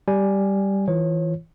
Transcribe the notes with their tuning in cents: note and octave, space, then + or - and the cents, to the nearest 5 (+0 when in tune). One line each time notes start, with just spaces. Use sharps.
G3 +0 G#5 +0
E3 -20 F4 -20 C#5 -30